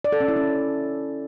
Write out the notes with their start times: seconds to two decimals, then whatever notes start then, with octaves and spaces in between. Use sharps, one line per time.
0.04 D5
0.12 A4
0.20 C#4
0.28 E4
0.36 C#4